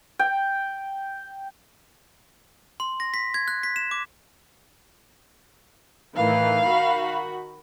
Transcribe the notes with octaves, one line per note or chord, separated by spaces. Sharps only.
G5
C6
A#6
B6
G#6
F#6
B6
E7
D6
A2 D#3 E3 F5
D#3 F#4 B5